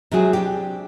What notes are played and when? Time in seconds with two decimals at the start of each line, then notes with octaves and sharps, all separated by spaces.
0.11 C3 F#3 G#3 F#4 G#4
0.33 C4 D4 G4